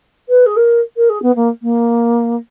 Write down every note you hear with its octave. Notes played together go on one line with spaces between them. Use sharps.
B4
G#4
A#4
A#4
G#4
B3
A#3
A#3